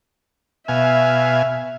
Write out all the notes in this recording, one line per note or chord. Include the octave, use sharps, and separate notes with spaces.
B2 E5 F5 G#5